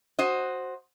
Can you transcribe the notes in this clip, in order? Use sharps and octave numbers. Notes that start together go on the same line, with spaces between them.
F#4 C5 D#5